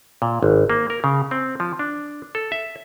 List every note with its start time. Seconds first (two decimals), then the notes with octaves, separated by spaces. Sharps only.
0.22 A#2
0.43 G#1
0.70 A#3
0.90 A#4
1.04 C#3
1.31 C4
1.60 F3
1.79 D4
2.35 A4
2.52 E5